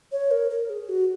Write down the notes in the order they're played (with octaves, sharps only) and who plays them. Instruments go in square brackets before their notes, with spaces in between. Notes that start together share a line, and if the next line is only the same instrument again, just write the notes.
[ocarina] C#5
A#4
A#4
G#4
F#4